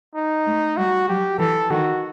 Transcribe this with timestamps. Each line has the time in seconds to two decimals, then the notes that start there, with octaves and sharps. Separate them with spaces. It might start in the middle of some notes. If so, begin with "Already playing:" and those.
0.15 D#4
0.46 A3
0.77 G3 F#4
1.08 F#3 G4
1.39 E3 A4
1.70 D#3 F#4